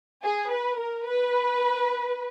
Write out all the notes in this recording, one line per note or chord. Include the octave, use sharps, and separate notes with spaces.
G#4
B4
A#4
B4